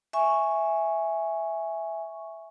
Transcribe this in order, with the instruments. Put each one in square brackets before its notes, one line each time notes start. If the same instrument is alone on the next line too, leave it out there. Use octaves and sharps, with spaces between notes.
[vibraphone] E5 G#5 C#6